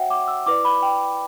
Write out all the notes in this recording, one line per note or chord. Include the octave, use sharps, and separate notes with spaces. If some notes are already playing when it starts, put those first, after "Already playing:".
Already playing: F#4 C#5 E5 F#5 G5
D6
E6
E4 B4 D5 D6
B5
G5